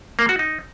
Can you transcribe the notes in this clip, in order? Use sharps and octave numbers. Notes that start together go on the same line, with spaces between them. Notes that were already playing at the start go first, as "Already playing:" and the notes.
A#3
F#4
D#4